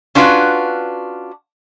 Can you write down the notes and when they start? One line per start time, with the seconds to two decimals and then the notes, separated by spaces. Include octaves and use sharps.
0.15 C#4 D4 F4 F#4 B4